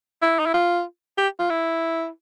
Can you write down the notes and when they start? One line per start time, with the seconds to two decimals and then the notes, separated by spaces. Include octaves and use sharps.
0.22 E4
0.39 D#4
0.46 E4
0.54 F4
1.18 G4
1.39 F4
1.50 E4